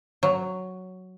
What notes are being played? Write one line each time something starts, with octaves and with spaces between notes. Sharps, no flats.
F#3